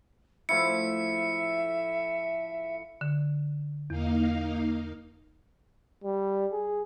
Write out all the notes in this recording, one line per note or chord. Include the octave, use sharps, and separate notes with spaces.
A2 F3 E4 E5 C#7
D3
E2 A#3 D#4 F5
G3
G#4